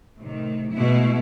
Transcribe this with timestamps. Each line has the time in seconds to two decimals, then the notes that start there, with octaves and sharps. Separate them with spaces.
0.18 A2 C3 D#3
0.73 B2 G#3 A3 E4